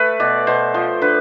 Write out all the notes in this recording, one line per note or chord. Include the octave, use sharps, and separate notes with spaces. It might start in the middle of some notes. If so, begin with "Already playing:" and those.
Already playing: A3 B4
B2 D5
B2 C5
F3 C5
D3 B4